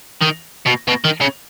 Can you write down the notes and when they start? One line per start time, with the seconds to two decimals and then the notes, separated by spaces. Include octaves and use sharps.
0.22 D#3
0.66 B2
0.88 B2
1.05 D#3
1.21 C#3